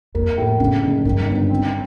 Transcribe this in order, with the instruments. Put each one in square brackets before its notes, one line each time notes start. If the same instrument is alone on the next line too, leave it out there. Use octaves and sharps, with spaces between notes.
[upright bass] F2 [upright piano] A#3
[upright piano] A2
[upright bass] F2 [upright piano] C#3
[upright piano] F#1
[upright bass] G2 [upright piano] D#3
[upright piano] G1
C4